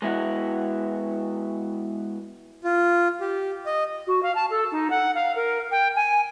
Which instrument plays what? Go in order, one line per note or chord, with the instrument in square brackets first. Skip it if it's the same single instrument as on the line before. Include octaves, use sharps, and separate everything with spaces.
[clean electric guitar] G#3 B3 E4 F#4
[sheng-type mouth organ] F4
G4
D#5
[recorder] F#4
F5
A5
A4
D#4
F#5
F5
A#4
G5
G#5